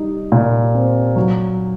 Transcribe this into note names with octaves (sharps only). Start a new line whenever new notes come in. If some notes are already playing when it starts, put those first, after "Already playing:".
Already playing: G3 D#4
A#2
C4
F#3